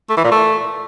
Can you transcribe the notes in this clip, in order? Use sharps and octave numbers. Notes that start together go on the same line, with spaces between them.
A3
E3
A#2
A3